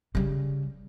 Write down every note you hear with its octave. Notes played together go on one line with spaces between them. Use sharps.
C#3 G3